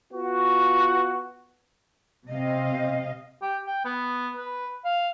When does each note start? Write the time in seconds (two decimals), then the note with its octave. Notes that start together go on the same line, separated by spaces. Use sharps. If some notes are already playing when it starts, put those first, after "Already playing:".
0.12 B3 F4 F#4
2.28 C3 C4 D#5 F5
3.42 G4
3.67 G5
3.85 B3
4.37 B4
4.84 F5